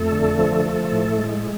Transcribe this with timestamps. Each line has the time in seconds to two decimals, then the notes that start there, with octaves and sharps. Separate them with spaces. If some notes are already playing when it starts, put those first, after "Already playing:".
Already playing: F2 A3 A4
0.12 D3
0.39 F3
0.65 F3
0.92 A2
1.19 G#3